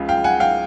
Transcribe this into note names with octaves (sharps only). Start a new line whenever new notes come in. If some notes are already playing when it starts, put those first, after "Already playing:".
Already playing: C#2 C#3 F3
F5 G5
F#5 G#5
F5 G5